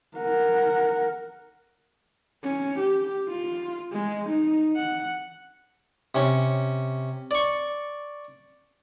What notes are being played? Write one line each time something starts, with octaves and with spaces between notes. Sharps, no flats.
A#4 F#5
C#4
G4
F4
G#3
D#4
F#5
C3 C#4
D5 C#6